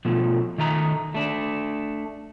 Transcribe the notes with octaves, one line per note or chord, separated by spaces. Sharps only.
B2 F3 A3
D#3 A3 A#5
A3 D4